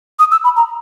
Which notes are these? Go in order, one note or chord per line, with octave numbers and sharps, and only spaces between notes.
D#6
E6
B5
A#5